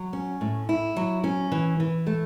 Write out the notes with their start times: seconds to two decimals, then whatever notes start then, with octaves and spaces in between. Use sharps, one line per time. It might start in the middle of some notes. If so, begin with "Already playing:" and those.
Already playing: F#3
0.13 C#4
0.41 A2
0.69 E4
0.96 F#3
1.24 C#4
1.52 E3
1.80 E3
2.07 A3